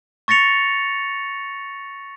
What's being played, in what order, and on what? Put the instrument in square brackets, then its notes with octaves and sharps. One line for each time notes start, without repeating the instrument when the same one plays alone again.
[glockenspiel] C#6 A6 A#6 C#7 F7